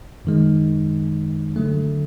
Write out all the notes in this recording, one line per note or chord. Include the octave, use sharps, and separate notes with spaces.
F#2 D#3 G#3
D3 F#3 A3